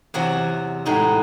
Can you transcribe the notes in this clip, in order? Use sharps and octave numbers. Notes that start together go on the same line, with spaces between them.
E2 C3 F#3 C4 F#4
A2 G#3 D#4 F#4